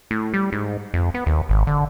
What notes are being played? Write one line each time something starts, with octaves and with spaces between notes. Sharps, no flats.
A2
G3
G#2
F2
B3
D#2
G#1
D3